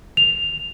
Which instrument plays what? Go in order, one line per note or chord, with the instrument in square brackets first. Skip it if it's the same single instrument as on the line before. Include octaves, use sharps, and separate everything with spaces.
[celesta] F7